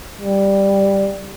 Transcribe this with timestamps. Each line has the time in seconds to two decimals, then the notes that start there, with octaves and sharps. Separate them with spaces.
0.21 G3